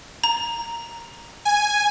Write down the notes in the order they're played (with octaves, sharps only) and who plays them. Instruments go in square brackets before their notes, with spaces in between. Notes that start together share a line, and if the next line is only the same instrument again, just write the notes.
[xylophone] A#5
[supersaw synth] G#5